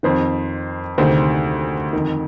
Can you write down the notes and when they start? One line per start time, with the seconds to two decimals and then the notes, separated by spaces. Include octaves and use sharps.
0.03 F2 D#3 C5
0.98 D2 C3 D#3 C5
1.93 F2 D#3